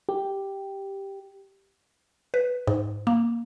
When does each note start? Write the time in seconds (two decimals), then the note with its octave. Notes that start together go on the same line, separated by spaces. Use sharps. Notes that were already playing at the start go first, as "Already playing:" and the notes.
0.09 G4
2.34 B4
2.67 G#2
3.07 A#3